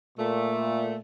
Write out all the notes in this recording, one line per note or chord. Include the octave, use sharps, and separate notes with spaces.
A#2 A3